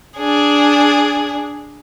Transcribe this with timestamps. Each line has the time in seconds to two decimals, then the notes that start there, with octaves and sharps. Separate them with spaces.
0.18 D4 G#4